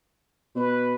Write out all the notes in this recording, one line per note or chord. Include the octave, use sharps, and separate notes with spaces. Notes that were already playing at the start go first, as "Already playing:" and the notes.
B2 B4